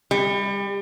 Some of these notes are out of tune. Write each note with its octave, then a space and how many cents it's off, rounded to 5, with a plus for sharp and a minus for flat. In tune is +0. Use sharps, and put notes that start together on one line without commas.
G3 +30